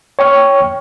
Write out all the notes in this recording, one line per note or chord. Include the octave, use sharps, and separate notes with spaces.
C#5 G5 C#6 F6